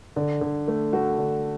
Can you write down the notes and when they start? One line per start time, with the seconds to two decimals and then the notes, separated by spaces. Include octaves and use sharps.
0.16 D3
0.41 D3
0.68 A3
0.93 A3 F#4
1.18 D3